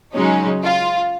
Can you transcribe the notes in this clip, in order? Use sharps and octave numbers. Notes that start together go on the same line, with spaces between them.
C#3 F#3 G#3 C#4 D#4
F4